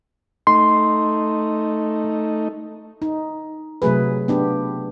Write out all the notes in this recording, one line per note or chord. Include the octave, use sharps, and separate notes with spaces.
A3 D#4 C6
D#4
C3 F#3 A3 G#4 B4
B3 D4 G4